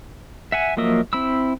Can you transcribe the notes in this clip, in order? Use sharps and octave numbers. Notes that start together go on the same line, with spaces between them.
E5 F#5 G#5
F3 F#3 A#3 D#5 E5
C4 E4 B5 E6